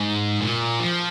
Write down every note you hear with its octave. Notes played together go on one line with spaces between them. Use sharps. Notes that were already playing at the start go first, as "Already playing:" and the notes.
Already playing: G#2
A#2
F3